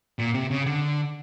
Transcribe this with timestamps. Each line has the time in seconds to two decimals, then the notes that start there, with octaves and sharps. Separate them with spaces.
0.19 A#2
0.34 C3
0.51 C#3
0.66 D3